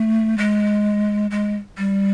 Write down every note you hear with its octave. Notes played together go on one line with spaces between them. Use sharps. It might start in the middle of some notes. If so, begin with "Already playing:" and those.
Already playing: A3
G#3
G#3
G3